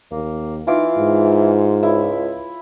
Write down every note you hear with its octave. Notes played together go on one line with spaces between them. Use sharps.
D#2 A#3
E3 D#4 F4 D6
G#2
C#2 E4